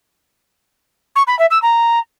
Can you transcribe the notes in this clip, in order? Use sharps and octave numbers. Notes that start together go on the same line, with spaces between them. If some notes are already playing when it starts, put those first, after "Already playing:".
C#6
B5
E5
E6
A#5